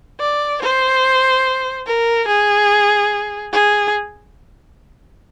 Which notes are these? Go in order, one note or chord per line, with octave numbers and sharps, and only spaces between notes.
D5
C5
A#4
G#4
G#4